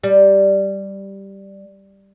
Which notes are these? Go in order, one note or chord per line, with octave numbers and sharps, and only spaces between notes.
G3